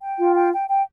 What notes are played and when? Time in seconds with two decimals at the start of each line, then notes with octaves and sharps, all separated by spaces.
0.02 G5
0.18 F4
0.35 G5
0.53 G5
0.69 G5